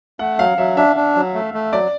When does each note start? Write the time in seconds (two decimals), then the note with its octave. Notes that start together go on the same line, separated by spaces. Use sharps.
0.19 A3 F#5
0.38 F#3 F5
0.58 F#3 E5
0.77 D4 E5
0.96 D4
1.15 F#3
1.34 A3
1.54 A3
1.73 F#3 D5